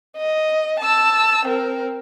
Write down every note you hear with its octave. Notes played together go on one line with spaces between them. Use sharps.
D#5
A5 E6
C4 A#4